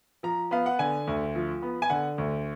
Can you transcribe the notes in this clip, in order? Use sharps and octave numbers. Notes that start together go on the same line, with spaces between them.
F3 A#5
B3 F5
F#5
D3 G#5
D2
F3
B3
G#5
D3 F#5
D2